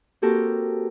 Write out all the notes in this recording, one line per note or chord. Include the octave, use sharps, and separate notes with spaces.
A#3 C4 F#4 G4 A4 A#4